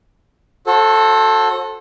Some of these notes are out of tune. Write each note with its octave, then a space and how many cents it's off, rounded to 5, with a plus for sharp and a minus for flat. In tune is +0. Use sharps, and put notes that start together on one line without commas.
F#4 -25 A4 +0 C5 +35